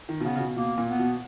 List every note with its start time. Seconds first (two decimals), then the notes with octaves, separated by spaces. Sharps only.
0.09 D#3
0.20 B2
0.24 C#3 B3
0.36 C#3
0.40 B2
0.56 B2 A#3
0.78 A#2
0.89 B3
0.99 B2